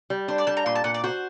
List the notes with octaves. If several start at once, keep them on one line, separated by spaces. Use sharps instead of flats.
G3
D4 C5
D5
G3 A5
A#5
A#2 C6
A5
A#2 F#5
D5
F#4 C5